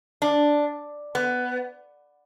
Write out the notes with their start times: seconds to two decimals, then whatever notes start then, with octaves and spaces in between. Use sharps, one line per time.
0.22 D4
1.15 B3